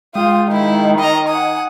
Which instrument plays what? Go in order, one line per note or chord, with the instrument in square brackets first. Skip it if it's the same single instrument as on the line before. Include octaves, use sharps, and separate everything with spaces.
[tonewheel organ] G#3 G5 [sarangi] F4 [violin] D#6
[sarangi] D#3 [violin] E4
[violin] D#5 A#5
[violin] F#5 D#6 [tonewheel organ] G#5